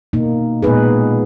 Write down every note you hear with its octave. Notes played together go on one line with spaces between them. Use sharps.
B2 A#3 D#4
A#2 G#3 B3 D#4 G#4 B4